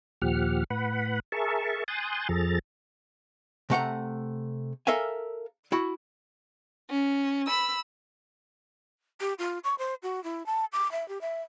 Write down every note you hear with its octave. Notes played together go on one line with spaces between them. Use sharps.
D#2 A#2 F3 G4 F#5 F6
A2 B4 F#5 B5
G#4 A#4 E5 A5 C#6
G#5 C6 D#6 F#6 G6 A6
F2 F3 G#4 A4 A#5 A6
C3 A3 F#5 A#5
A4 A#4 E5 F5 G#5
E4 F#4
C#4
B5 E6
G4
F4
C#6
C5
F#4
E4
A5
D6
E5
G4
E5